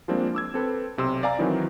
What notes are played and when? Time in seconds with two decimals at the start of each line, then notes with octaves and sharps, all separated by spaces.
0.08 F3 G3 G#3 A#3 C4 D4
0.35 D6 E6 G#6
0.54 C4 A4 B4
0.97 B1 C3 C6 E6
1.23 D5 F5 G#5 A#5
1.38 D#3 E3 F#3 C4 D#4 E4